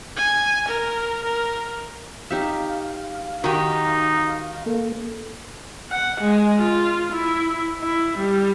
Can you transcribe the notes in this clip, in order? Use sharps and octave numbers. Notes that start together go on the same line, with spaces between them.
G#5
A#4
A#4
D#4 G4 E5 F5
D#3 D#4 F#4 G4
A#3 A4
F#5
G#3
F4
E4
E4
G3